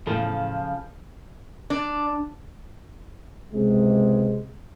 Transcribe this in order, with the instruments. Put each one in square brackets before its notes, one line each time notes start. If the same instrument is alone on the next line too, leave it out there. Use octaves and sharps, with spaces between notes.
[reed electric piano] E2 A2 [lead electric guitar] C#3 F3 [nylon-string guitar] A4
[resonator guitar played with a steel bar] D4
[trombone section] C#2 C3 G#3